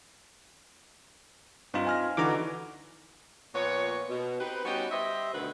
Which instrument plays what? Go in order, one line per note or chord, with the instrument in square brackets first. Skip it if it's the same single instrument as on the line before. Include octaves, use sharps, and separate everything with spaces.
[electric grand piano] G2 [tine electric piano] C4 D#4 F4
[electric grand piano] G#5 F6 A#6
[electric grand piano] D3 E3 D#4 [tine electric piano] F#4 A#5 D6
[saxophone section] A#2 F3 B3 C#5
B2
C4 D#4 G4 B4
G3 B3 C#4 D#4 F#4 G4
G3 G4 C5 D#5 E5
D2 B2 D3 D#3 B3 B4